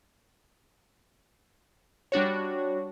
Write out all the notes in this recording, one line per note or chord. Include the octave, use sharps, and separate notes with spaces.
G3 D4 F#4 C#5